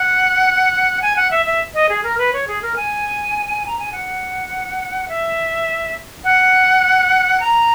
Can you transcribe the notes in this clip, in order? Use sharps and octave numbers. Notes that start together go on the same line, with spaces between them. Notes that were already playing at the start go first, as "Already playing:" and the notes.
Already playing: F#5
G#5
F#5
E5
E5
D#5
G#4
A#4
B4
C#5
G#4
A#4
G#5
A#5
G#5
F#5
E5
F#5
A#5